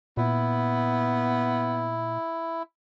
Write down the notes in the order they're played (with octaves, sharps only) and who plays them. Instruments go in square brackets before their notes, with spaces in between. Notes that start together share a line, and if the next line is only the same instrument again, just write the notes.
[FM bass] A#2 [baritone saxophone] B3 [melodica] E4